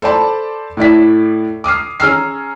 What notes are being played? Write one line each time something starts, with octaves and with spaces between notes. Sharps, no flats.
A4 C5 D5 A5 B5
A2 E4 D5 B6
D6 D#6 F6 C7
C#4 G#4 A#5 E6 F6 C7